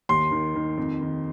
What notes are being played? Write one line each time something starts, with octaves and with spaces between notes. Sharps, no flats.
D#2 C6
D#3
D#3
F2
D#3